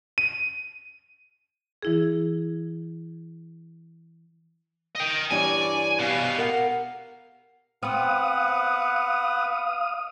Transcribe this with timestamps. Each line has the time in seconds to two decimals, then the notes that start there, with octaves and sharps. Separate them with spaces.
0.18 D#7
1.83 E3 E4 G#4
4.95 D#5 G5
5.31 G2 E3 D4 C#5 D5 G#5
5.99 B2 G4 F5
6.38 A#4 F#5
7.83 B3 C4 B4 F5 F#5 D#6